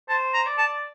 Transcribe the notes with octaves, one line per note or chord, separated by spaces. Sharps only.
C5 A5
A#5
D5
A5